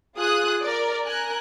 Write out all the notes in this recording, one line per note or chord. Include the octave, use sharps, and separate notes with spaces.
F4 G#4 D#6 F#6
A#4 D5
A#4 G#5 F#6